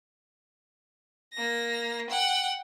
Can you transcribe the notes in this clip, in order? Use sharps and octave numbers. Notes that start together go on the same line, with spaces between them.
A#3 A#6
F#5 G5